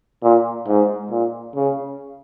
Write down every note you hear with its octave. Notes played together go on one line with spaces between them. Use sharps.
A#2
G#2
A#2
C#3